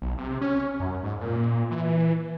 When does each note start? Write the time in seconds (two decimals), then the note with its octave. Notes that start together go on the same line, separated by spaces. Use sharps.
0.02 B1
0.18 C3
0.41 C#4
0.80 F#2
1.03 G#2
1.21 A#2
1.71 E3